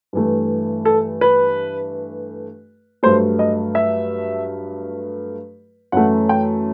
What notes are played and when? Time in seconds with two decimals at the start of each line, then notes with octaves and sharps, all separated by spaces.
0.13 G2 E3 A3
0.85 A4
1.21 B4
3.03 G2 F#3 A3 C5
3.39 D#5
3.75 E5
5.92 F#2 E3 A3 F#5
6.29 G5